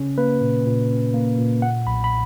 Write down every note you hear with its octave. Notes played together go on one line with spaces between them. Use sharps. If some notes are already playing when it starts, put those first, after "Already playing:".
Already playing: C#3 C#4
A#3 B4
A#2
A#2
C#4
A#3
A#2
A#2 F#5
B1 B5
B5